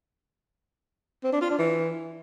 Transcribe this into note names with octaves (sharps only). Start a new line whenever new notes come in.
C4
D4
F4
D4
E3